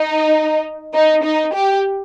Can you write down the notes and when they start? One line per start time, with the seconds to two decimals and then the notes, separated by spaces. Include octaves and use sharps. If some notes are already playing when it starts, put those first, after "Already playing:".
Already playing: D#4
0.94 D#4
1.24 D#4
1.54 G4